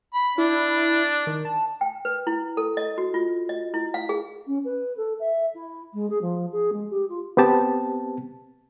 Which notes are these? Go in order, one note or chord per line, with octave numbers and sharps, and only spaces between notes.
B5
D4 E4
D#3
A5
G5
B4
E4
A4
D#5
F#4
F4
D#5
E4
F5
G#4
C#4
B4
A4
E5
E4
G#3
G#4
F3
G#4
G#3
G4
F4
B3 C4 G4 A5